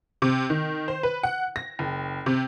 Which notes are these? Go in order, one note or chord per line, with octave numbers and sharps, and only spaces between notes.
C3
D#3
C5
B4
F#5
A#6
F#1
C3